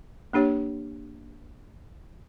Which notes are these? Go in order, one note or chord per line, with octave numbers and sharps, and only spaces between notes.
A#3 D4 G4 C#5